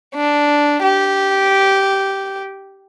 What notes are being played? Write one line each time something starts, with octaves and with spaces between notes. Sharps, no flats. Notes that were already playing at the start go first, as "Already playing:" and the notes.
D4
G4